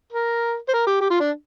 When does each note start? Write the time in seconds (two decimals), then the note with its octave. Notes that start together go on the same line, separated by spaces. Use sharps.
0.12 A#4
0.68 C5
0.73 A#4
0.87 G4
1.01 G4
1.10 F4
1.20 D4